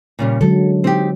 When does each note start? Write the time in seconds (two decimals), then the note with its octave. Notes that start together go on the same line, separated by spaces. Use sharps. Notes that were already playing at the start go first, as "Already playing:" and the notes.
0.19 A#2 C#3 G3
0.41 D3 F#3 G#3 A4
0.84 C4 D#4 G4